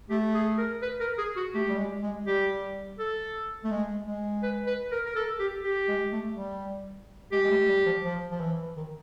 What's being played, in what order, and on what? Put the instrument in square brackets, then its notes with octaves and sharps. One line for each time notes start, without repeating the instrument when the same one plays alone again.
[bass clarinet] A3 [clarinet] G4
[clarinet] G#4
A#4
B4
A#4
G#4
F#4
[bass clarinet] A3 [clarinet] G4
[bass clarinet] G3
G#3
G#3
[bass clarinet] G3 [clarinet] G4
[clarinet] A4
[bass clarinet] A3
G#3
G#3
[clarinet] B4
B4
A#4
A#4
A4
G4
G4
[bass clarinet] G#3
A3
G3
[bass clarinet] G#3 [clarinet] G4
[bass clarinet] G#3
A3
G3
F3
F3
F3
E3
D#3